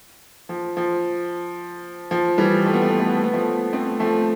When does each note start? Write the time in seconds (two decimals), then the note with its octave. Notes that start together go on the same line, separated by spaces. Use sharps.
0.49 F3
0.77 F3
2.11 F3
2.38 E3 G3
2.66 A3
2.74 B3
2.82 A3
2.90 B3
2.99 A3
3.07 B3
3.17 A3
3.24 B3
3.33 F3 A3
3.73 A3 C4
4.00 F3 A3